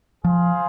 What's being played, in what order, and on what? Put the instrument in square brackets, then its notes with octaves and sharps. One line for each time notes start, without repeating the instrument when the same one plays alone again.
[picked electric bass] F3 [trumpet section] F4 G#4 C5 F5